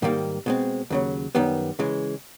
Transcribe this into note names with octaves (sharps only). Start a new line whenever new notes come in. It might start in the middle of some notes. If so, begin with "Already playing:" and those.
G#2 D#3 G3 A#3 D#4
B2 G#3 C4
D#2 C#3 F#3
F#2 D#3 G3 B3
C#3 E3 G#3